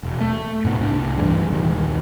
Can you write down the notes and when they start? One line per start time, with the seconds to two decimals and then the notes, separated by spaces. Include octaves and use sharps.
0.03 E1
0.21 A3
0.65 G#2 C3 B3
0.81 C2 D4
1.18 G2 E3 G3 G#3
1.52 D#1 C2 G#2 D#3